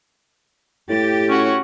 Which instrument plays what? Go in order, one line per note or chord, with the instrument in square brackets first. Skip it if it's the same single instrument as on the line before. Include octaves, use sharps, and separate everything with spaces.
[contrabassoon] A2 [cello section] G4 [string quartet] A6
[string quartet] C#4 F#4 C#5